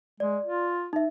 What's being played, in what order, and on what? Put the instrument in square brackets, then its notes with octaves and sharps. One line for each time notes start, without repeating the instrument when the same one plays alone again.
[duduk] G#3 [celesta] D5
[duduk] F4
[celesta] D#4 E5